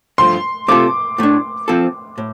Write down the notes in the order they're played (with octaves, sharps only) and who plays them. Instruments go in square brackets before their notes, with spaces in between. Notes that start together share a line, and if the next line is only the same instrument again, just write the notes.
[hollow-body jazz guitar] G2 F3 A3 [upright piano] C6
[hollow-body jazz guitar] C3 A3 F4 A4 [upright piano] D6
[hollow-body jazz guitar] A2 A3 D4
F3 C4 A4
A2